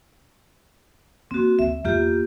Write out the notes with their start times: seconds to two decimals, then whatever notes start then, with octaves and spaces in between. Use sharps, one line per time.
1.31 A#3 C4 F#4
1.59 D2 E5
1.85 E2 A#3 F4 G4